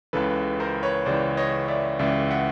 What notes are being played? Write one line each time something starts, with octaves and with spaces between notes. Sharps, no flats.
C#2 C#3 E3 A4 B4
A#4 C5
B4 C#5
C#2 C#3 E3 C5 D5
C#5 D#5
D5 E5
C#2 C#3 E3 D5 E5
E5 F#5